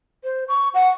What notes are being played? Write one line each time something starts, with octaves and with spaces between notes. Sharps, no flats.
C5
C#6
F#5